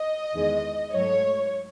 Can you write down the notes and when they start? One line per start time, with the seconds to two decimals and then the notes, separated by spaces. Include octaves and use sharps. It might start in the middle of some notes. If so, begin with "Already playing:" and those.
Already playing: D#5
0.33 E2 D#3 G#3
0.93 G#2 F#3 A3 C#5